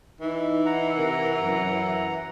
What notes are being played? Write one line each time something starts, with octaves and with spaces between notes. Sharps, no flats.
E3 D#4
F#5 A#5
C3 A#4
F#2